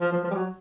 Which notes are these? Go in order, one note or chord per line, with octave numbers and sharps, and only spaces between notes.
F3
F3
F3
G3
F#3